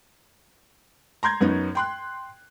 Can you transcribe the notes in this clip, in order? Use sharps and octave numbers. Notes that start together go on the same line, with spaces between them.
A#5 C6 G6 G#6
F#2 B3 C#4 D#4
G5 C6 F#6